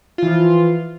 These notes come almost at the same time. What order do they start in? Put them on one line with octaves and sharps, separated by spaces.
F4 E3 F3